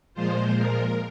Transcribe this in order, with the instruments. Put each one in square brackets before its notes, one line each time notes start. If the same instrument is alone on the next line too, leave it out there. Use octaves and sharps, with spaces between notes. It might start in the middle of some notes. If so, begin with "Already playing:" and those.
[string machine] A#2 F3 G#3 F4 C5
A#4